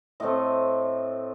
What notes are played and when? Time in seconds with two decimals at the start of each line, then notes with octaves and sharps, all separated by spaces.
0.20 A2 A3 C4 D#5